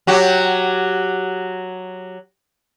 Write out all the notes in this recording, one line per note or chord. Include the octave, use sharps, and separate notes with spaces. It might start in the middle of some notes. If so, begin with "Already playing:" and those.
F#3 F#4 G4